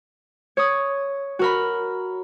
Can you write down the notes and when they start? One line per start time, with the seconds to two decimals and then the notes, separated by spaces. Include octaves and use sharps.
0.57 C#5 D#6
1.39 F#4 A#4 B5